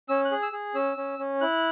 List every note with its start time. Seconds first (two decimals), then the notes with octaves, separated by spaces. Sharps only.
0.09 C#4 E6
0.25 F#6
0.31 G#4
0.42 E6
0.52 G#4
0.74 C#4 E6
0.97 C#4
1.19 C#4
1.41 E4 F#6